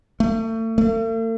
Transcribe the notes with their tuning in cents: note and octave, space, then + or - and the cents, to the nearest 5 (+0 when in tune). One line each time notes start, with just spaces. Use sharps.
A3 +35
A3 +45